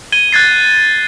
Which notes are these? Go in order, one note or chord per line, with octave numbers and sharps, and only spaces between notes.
G#6 D#7 G7
F#6 G#6 A6 C7